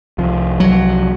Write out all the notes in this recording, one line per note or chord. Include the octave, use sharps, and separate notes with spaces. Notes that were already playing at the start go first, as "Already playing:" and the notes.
C2 C3 F3
F#3